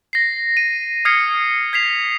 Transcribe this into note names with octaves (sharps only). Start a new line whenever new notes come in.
A#6 C7
D#7
D#6 F6 G#6 C7 C#7
G#6 B6 C7 F7